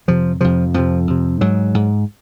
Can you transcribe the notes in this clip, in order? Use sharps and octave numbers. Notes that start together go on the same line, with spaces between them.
F2 C3 F3
F2 C3 F3
F2 C3 F3
F2 C3
G#2 F#3
G#2